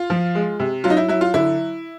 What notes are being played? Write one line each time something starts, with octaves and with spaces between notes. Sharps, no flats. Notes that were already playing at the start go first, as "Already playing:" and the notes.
Already playing: F4
F3
G#3
C3
F#3 F4
D#4
E4
F#3 E4
F4
D3 E4